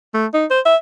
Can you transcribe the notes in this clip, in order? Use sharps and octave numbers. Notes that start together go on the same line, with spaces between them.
A3
D#4
C5
E5